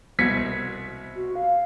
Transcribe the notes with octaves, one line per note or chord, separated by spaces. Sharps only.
C2 B2 G#6 B6 C#7
F#4
F5